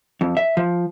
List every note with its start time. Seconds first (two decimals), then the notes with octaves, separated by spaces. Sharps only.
0.21 F2
0.37 E5
0.57 F3